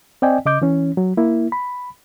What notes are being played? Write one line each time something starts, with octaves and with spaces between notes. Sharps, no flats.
C4 D5 D#5 G5 G#5
C#3 D#5 D6 G6
E3 C#4
F#3
A#3 E4
B5